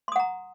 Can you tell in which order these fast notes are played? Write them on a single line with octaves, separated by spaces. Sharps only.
C6 D#6 F#5 A#5